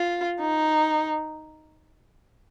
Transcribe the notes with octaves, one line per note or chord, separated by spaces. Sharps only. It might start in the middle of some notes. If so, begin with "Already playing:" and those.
Already playing: F4
D#4